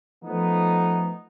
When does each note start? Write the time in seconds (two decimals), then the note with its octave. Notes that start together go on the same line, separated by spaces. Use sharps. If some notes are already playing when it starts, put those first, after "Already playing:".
0.23 F3 A3 B3 D#4